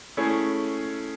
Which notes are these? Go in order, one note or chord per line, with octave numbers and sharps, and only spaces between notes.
A3 C#4 E4 G#4